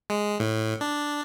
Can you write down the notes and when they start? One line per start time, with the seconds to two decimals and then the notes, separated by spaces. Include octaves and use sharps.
0.10 G#3
0.40 A2
0.81 D4